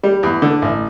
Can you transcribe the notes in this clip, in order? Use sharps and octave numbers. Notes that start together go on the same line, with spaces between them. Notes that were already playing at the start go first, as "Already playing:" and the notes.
G3
E2
D3
A1